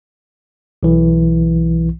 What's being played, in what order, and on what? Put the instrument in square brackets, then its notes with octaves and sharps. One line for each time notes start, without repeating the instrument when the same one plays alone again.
[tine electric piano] B1 E3